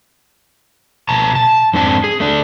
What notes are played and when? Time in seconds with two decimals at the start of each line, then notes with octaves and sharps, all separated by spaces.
1.09 B2 A5 A#5
1.35 A5
1.74 F2 G#2 C4 D4 G#5 A5
2.04 G#4
2.20 A3 D4